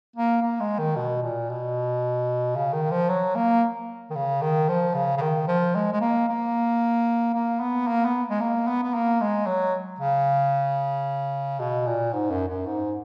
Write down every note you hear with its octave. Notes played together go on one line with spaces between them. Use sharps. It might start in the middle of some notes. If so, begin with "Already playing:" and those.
A#3
A#3
G#3
D#3
B2
A#2
B2
C#3
D#3
F3
F#3
A#3
D#3
C#3
D#3
F3
C#3
C#3
D#3
F3
G#3
G#3
A#3
A#3
A#3
B3
A#3
B3
G#3
A#3
B3
B3
A#3
G#3
F#3
C#3
B2
A#2
G#2
F#2
F#2
G#2